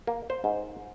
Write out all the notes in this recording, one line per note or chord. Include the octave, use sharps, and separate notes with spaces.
A#3
C5
G#2